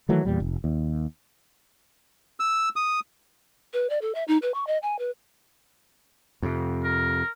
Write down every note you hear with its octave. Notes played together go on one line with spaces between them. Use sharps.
D#3 E3 F#3 A3
E2 A#2 G3
F1
D#2
E6
D#6
B4
D5
A4
E5
D#4
B4
C#6
D#5
G#5
B4
F2 C3
A#4